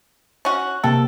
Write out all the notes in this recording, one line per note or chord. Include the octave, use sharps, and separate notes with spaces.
C#4 F#4
C3 A#3 A4 G5